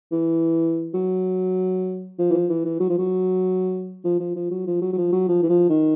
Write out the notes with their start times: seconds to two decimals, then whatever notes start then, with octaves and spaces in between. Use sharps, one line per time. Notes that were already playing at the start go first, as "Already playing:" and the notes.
0.12 E3
0.94 F#3
2.19 F3
2.30 E3
2.33 F3
2.49 E3
2.65 E3
2.80 F#3
2.89 F3
2.98 F#3
4.04 F3
4.19 F3
4.35 F3
4.51 F#3
4.67 F3
4.81 F#3
4.93 F#3
4.97 F3
5.12 F#3
5.28 F3
5.43 E3
5.49 F3
5.69 D#3